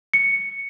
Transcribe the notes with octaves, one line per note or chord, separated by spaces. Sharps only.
C#7